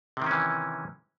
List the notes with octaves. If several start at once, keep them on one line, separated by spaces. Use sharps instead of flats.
C3 D#3 E3 C#4